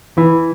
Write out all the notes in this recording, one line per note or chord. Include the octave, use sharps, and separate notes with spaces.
E3